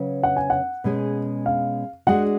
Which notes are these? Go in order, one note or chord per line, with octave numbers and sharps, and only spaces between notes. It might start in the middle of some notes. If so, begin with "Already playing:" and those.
Already playing: C#3 F#3 C#4 B4
F#5
G#5
F#5
B2 G#3 C#4 G#4
F5
G#3 D4 F#4 F#5